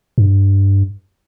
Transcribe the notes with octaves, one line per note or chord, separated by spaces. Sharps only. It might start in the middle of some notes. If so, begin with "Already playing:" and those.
G2